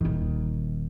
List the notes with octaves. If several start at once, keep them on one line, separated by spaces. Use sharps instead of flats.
D#1 D#3